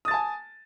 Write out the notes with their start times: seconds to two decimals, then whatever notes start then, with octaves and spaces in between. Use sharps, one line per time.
0.05 D#6
0.08 A6
0.11 A5
0.14 G#5